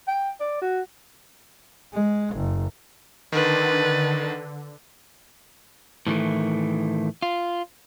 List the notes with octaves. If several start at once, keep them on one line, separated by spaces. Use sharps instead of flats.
G5
D5
F#4
G#3
F#1
D3 D#3 B4 A6
A2 D#3 E3 A3
F4